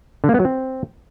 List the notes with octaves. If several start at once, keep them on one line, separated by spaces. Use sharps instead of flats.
D3
A#3
B3
F#3
C4